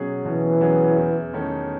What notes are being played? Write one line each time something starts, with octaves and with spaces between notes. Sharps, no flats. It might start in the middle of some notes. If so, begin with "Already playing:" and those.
Already playing: B2 F#3 C#4 G#4
B2 E3
F#3 C#4 G#4
E2
D#3 A3 C#4